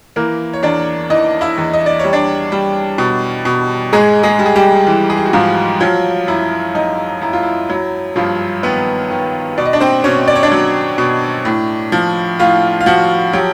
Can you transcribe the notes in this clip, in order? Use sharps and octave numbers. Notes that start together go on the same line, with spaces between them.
E3 A#3 A#4
C#5
E2 D4 D5
E3 D#4 D#5
E4 E5
E2
D#5
D5
G3 C#5
D4 D5
G3
B2
B2
G#2 G#3 G#4
G#3 G#4
G3
G#4
G3 G4
E3
G#4
G4
F#4
G#2 F3 F4
F3 F#3 F4
F#2 E4
F#2 D#4
F#2 E4
F4
E4
F#3 E4
G2 F3 F4
D#3 B3 B4
D#3
B2 D5
D#5
D4 D5
C4 C5
B2 C#4 C#5
D5
C#5
D4 D5
F#3
B2
A2
F3
A2 F4 F5
F5
F3 F#4 F#5
F#3 G4 G5